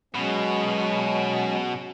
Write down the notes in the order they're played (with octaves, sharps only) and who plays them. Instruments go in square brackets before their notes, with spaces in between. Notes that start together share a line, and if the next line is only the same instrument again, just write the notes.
[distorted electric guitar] B2 [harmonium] F#3 G#3 C#4